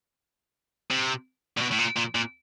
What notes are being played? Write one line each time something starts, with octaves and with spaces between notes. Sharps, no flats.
C3
A#2
B2
A2
A#2
A#2
A#2